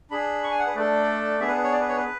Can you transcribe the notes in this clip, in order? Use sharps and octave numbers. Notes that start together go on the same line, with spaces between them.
D4 G#4 B5
C#6
G#5
F#5
B4
A3 D4 A4 D5
B3 D4 G#4 E5
B4
C#5
D5
B4
C#5
B4